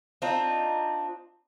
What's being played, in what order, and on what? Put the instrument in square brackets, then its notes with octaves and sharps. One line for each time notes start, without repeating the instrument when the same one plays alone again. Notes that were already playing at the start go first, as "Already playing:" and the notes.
[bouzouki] C4 D4 D#4 F4